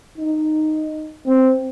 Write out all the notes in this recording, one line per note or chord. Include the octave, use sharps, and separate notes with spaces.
D#4
C4